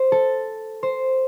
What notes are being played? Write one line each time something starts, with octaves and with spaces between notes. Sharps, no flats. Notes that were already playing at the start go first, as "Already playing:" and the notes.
Already playing: C5
A4
C5